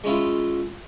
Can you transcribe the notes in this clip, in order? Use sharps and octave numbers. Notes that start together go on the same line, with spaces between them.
G#3 C#4 E4 F4